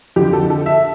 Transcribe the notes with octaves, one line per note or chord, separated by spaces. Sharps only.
F2 D3 F3 G4
A4
A4
E5